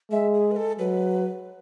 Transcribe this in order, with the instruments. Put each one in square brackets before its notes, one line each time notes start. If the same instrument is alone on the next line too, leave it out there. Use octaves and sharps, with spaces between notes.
[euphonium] G#3 [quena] E5
[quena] G#4
B4
A4
[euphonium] F#3 [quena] B4